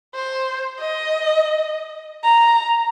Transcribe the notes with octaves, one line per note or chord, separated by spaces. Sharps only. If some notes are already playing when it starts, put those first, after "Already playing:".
C5
D#5
A#5